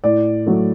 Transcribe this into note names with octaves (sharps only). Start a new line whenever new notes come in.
A2 D5
F#3 A3